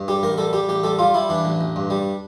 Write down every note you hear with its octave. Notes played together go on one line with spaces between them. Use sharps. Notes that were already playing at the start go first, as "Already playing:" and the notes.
Already playing: G2
G3 G4
A1 A#4
G3 A4
G3 G4
A1 G4
G3 A4
G3 F4
G3 E4
E3 D4
A1
A1
G2
G3